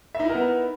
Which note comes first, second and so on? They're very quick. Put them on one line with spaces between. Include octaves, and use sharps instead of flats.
E5 D#4 E4 A#4 B3